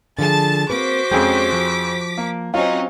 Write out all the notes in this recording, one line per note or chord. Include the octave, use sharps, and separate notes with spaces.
D3 F3 F4 G#4 A5 A6
A#3 C4 F#4 B4 C5 D6 B6
F2 G#3 C#4 G#4 G5
F3
A#3
F#3 C4 C#4 D#4 F4